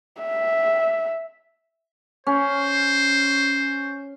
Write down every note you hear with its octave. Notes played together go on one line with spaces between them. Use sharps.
E5
C#4 C5